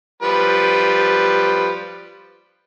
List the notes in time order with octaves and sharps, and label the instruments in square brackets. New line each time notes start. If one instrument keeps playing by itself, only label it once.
[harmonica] F3 G3 B4